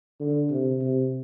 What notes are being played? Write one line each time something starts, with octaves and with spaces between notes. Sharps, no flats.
D3
C3
C3